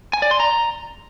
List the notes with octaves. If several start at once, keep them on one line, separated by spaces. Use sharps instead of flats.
G#5
D5
C6
A#5